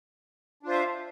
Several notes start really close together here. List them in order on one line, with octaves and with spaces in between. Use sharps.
D4 F4 C5 E5 F5